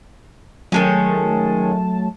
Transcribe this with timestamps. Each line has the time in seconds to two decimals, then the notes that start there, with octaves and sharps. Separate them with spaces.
0.72 D#3 F#3 G#3 A3 C#4 A5